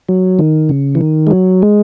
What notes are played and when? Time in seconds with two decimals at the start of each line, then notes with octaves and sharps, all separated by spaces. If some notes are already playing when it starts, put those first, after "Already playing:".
0.09 F#3
0.39 D#3
0.69 C#3
0.95 E3
1.01 D#3
1.27 G#3
1.31 F#3
1.62 G#3